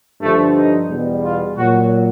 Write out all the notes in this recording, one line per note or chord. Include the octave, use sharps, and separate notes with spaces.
G2 D3 F3 A3
D#4
E2 B2 G3
F4
A#2 F#3 F#4